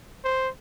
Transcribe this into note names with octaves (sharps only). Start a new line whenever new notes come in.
C5